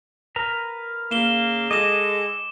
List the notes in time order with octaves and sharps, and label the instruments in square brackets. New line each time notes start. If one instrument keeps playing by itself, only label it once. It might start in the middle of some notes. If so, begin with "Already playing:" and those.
[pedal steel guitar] A#4 B4 A#5
[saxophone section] C#3 A#3 [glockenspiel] E7 G7
[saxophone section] G#3 A4 [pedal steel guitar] D#5 [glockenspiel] D6 E7